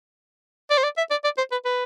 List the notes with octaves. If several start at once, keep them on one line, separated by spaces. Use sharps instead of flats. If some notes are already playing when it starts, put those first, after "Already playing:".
D5
C5
D5
E5
D5
D5
C5
B4
B4